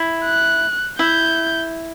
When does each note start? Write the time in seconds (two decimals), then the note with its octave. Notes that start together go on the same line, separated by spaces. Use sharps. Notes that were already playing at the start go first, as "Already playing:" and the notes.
Already playing: E4
0.25 F#6
0.99 E4 G6